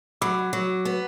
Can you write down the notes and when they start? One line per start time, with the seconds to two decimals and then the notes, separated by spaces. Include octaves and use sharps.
0.21 F#3 B5 D6
0.53 F#3
0.85 B3